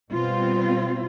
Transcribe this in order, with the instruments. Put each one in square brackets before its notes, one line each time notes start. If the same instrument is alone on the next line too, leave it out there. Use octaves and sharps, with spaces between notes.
[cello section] B2 G3 C4 F4